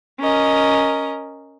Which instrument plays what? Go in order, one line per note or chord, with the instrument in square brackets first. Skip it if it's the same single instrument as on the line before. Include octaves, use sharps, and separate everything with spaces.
[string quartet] C#4 A#4 D#5